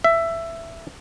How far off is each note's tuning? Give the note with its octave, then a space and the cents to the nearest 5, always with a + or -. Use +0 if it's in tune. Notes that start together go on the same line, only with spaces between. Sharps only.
E5 +15